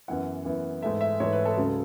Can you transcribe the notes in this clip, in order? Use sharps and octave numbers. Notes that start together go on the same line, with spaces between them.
F#2 E3 B3 E4 F#5
F#2 E3 B3 E4
G#2 E3 A3 E5
E5
G#2 E3 A3 C#5
B4
A4
C#2 C#3 F#3